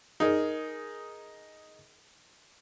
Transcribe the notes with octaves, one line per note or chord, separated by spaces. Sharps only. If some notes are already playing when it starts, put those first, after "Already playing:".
D#4 G#4 A#4